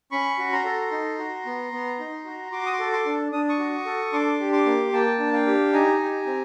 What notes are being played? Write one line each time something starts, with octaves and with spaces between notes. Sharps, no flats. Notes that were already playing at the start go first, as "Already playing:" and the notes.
C#4 B5 C#6
F#4
A#5 C6
A4
D#4
F#4
B3
B3
D#4
F#4
F#4 C6 D6
D#6
C6 D6
A4
C6 D6
D4
D4 D#6
C#6 D#6
F#4
A4
D4 C6 D6
G4
C6 D6
A#3
A#3 G5 A5
D4
F5 G5
G4
D#4 G#5 A#5
G4
C4